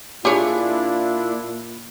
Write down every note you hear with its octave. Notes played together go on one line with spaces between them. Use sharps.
A#2 D4 E4 F4 G4 G#4 C#5